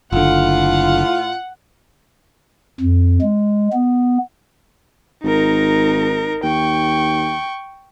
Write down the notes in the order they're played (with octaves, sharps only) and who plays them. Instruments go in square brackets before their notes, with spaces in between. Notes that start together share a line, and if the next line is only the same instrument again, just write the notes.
[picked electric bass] F#1 D3 [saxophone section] A2 F4 [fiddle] F#5
[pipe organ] F2
G#3
B3
[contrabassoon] G#1 [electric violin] D#4 A#4
[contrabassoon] D#2 [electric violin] G5 C#6